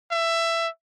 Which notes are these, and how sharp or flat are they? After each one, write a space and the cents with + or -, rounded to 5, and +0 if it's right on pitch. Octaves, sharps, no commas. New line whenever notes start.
E5 +15